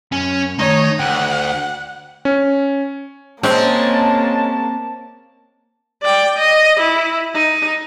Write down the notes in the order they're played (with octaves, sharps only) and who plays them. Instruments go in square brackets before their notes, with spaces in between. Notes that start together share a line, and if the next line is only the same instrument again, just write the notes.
[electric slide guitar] F#2 [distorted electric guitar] C#4
[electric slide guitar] D#3 A3 [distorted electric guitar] D#4 [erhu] C#5
[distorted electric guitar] D2 [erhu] F#5 [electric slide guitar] G5
[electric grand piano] C#4
[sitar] G#3 C#4 [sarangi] A#3 [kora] C4 [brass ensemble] A5
[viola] D5 G5
D#5
E4
D#4